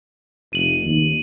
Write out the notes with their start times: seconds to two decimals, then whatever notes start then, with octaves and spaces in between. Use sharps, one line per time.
0.53 F1 D#7 F#7
0.83 D#2